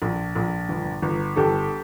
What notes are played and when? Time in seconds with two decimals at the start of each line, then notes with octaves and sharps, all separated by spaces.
0.02 A#1
0.36 A#1
0.69 G1
1.02 G1
1.36 G1 G4 A4